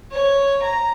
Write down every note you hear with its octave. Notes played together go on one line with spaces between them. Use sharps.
C#5
A#5